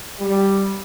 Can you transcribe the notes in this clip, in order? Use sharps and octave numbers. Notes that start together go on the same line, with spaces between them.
G3